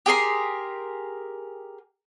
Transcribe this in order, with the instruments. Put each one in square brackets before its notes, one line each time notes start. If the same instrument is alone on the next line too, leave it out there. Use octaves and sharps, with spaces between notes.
[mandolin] G4 G#4 A#4 C6